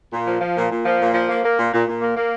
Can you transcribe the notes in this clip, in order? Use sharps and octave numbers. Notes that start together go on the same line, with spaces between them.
A#2
F3
F3
A#2
A#2
F3
A#2
F3
A#3
A#3
A#2
A#2
A#2
A#3
A#3